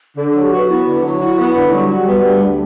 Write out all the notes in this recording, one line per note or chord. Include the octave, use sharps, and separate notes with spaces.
D3 A4
F#3 A4
G4
F#4 B4
B3 E4
D3
F#3
F#4
B3
D3
F#3 G3
F#4
B3
D2
D3